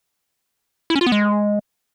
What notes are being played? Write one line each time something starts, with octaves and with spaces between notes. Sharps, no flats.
E4
C#4
F4
B3
G#3